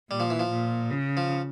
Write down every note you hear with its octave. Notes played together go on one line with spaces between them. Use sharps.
A#2 G3
F3
E3
F3
A#2
C#3
F3